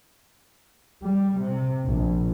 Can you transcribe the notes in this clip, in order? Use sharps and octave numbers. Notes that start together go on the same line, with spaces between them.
G3
C3
A#1